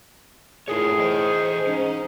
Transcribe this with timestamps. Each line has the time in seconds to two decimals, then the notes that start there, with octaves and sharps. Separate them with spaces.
0.68 A2 D#4 F4 G#4 A#4 C#5
0.99 E3 C5 D#5
1.67 G#2 C#4 D#4